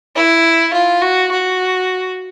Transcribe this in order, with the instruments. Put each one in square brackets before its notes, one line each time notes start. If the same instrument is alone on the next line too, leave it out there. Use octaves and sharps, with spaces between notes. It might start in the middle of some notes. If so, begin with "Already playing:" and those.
[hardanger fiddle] E4
F4
F#4
F#4